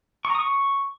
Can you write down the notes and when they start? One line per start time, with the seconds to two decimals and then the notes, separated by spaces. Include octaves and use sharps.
0.25 C#6
0.30 A#5
0.35 D#6
0.40 C#6